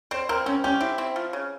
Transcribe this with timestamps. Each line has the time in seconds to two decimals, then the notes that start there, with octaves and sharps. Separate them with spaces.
0.11 C4 C5
0.29 C4 A#4
0.46 C4 C#4
0.64 C#4 G4
0.81 C4 E4
0.98 C4
1.16 F3
1.33 C#3